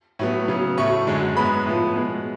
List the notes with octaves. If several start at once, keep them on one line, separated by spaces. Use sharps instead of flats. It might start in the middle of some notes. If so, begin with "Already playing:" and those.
A2 F#3 B3
C#3 F#3 B3
A2 F#3 A3 C#6
F#2 D3 G#3
G#2 G#3 B3 B5
A2 F3 B3
B2 G#3 B3